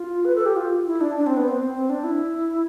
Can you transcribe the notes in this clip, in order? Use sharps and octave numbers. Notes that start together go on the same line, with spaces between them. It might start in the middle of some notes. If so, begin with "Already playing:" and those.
Already playing: F4
B4
A4
G4
F4
E4
D4
D4
C4
B3
C4
C4
D4
E4